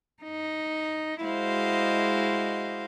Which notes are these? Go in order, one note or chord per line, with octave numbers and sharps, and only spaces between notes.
D#4
G#3 E4 F#4 C5 D#5 F5